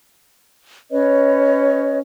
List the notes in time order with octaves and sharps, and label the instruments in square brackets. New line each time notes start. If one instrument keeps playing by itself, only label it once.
[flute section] C#4 B4 C#5 D#5